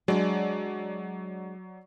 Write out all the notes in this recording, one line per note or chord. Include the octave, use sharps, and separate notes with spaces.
F#3 G#3 D4 D5